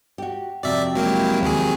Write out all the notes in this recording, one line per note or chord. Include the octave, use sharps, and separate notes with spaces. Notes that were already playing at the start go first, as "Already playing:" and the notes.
F#4 G4
F2 C3 F#4 D5 E5
F#3 G#3 A#3 E4 G4
D#2 F#3 G#4